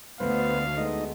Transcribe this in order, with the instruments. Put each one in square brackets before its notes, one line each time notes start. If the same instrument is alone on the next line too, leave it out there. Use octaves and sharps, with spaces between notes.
[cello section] D2 [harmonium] B3 [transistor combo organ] B4 C5 [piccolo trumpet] F5
[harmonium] G#3 A3 B3 [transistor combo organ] D#4 D#5